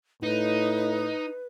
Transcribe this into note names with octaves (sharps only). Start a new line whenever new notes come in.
A2 D#4 B4